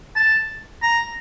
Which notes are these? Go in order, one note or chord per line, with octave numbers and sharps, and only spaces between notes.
A5
A#5